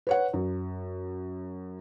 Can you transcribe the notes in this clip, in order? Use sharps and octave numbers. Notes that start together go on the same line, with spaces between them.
B4 C#5 F#5
F#2